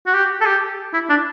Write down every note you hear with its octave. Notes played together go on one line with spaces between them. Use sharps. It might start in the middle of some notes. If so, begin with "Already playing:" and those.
F#4
G4
A4
G4
E4
D4